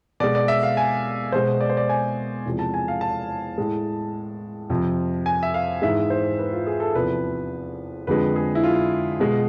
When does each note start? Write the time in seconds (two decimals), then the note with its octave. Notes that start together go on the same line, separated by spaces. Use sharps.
0.20 B2 G#3 D5
0.35 D5
0.48 E5
0.63 F5
0.77 G#5
1.32 B2 G#3 C5
1.61 D5
1.70 C5
1.77 D5
1.89 G#5
2.45 E2 C3 F3 G#3
2.59 A5
2.74 G#5
2.88 F5
3.01 A5
3.58 A2 G#3
4.70 F2 C3 F3
5.26 G#5
5.43 E5
5.54 F5
5.82 G#2 E3 G#3 E5
6.10 C5
6.39 B4
6.53 F4
6.67 G#4
6.80 A4
6.95 E2 C3 F3 B4
8.07 F2 D3 F3 G#3 B4
8.36 G#4
8.55 E4
8.64 F4
9.20 B2 G#3